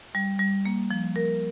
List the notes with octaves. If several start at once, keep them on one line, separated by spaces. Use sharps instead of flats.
G3
G3
A#3
F3
A#4